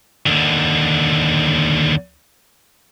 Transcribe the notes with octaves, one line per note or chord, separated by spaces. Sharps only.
D#2 D3